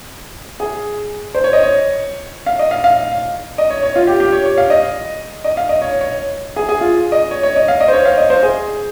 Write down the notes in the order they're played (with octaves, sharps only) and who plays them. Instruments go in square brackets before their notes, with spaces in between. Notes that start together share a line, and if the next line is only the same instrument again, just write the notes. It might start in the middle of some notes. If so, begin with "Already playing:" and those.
[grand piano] G#4
C5
C#5
D#5
C#5
F5
D#5
F5
F5
D#5
C#5
C#5
F4
G4
G4
C#5
C#5
F5
D#5
D#5
F5
D#5
C#5
C#5
G#4
G#4
F4
D#5
C#5
C#5
D#5
F5
D#5
C5
C#5
F5
D#5
C5
G#4